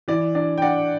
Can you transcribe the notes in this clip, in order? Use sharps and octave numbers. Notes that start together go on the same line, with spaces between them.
E3 D5
D4 D5
G5
D4 D5 F#5